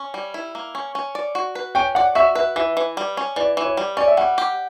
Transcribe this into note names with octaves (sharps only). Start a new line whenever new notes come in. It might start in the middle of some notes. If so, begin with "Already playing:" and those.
Already playing: C#4
G3
E4
A#3
C#4
C#4
D5
F#4
B4
C#4 G5
D5 F#5
F#4 E5
B4 E5
E3 E5
E3
G3
C#4
E3 D5
E3
C#5
G3
C#4 D5
E5
G3 F#5
G4